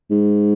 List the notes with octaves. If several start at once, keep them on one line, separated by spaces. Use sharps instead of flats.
G#2